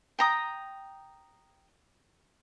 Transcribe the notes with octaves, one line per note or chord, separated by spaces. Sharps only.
G5 A#5 D#6